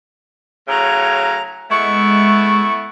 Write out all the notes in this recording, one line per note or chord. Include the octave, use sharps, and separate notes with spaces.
A2 C#3 F#3 A#5
G#3 A3 B3 E4 C#6